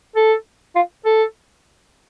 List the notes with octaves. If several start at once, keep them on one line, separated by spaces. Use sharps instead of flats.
A4
F4
A4